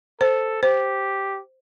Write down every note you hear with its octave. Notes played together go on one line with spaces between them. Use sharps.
A4 C5
G4 C5